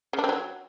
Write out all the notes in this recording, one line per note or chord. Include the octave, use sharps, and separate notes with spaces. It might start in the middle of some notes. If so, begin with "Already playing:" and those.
C#3
D4
C4
F#3